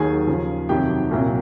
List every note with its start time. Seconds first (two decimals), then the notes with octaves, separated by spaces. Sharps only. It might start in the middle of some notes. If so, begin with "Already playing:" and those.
Already playing: D#2 D#3 F#3 G#4 G#5
0.27 D#2 C#3 F3
0.69 F2 C3 D#3 F#3 G4 G5
1.11 C2 A#2 F#3